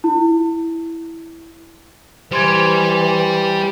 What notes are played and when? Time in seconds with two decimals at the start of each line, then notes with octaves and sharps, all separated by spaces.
0.04 E4
2.31 E3 G3 C5 C6 G#6